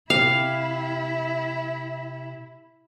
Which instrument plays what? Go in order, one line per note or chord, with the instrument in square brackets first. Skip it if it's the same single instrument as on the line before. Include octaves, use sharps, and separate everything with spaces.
[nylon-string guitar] C3 G4 [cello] E4 E5 [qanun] F5